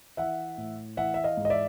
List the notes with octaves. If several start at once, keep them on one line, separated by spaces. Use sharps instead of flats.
E3 E5 F#5
A2
E3 E5 F#5
E5
D#5 F5
G#2
D#5
D5 E5